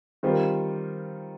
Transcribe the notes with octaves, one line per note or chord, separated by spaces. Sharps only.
D#3 G3 C4 F4